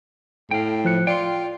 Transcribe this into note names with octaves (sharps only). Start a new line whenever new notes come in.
A2 F5 G5
F3 F#6 C#7
F4 D5 G5 C6